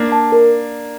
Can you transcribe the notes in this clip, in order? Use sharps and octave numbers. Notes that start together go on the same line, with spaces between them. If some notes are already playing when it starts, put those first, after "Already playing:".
Already playing: A#3 D4
A5
A#4